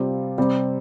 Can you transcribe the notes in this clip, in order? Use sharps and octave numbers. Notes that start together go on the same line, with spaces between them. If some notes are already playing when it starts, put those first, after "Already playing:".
Already playing: C3 G3 C4 F4
C3 G3 C4